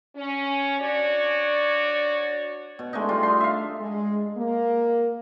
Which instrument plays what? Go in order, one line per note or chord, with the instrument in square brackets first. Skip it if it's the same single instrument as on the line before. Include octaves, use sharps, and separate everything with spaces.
[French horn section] C#4
D4 F#4 C#5 D5
[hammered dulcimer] B2
G#3 A3 D4 D#4
G3 F4
F4 C6
E5 F5
[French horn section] G#3
A#3